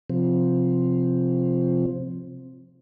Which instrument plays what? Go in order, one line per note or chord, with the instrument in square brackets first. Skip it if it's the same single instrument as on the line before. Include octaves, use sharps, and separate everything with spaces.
[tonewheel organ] C3 F3 C4